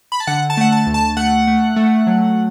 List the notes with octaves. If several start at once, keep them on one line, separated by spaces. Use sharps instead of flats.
B5
A5
D3 F#5
A5
A3 F#5
A5
D2
A5
A3 F#5
A3
A3
F#3